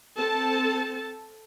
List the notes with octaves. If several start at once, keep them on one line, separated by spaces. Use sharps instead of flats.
C4 A4 A5